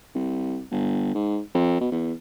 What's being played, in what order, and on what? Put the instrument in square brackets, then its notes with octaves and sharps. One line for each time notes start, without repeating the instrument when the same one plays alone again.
[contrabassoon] C2
G1
G#2
F2
B2
E2